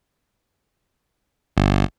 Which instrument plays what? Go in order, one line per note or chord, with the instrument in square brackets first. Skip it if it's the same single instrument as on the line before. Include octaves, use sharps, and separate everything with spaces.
[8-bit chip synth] G1